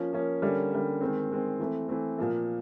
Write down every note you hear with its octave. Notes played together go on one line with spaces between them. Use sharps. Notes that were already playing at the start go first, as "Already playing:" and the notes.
Already playing: F3 A#3 C#4
F3 A#3 C#4
D3 G3 A#3 C#4
D3 G3 A#3 C#4
D#3 G#3 C4
D#3 G#3 C4
E3 A3 C4
E3 A3 C4
A#2 F3 A#3